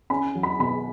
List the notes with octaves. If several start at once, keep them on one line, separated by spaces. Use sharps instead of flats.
C#4 B5
F#3
B5
B2 B5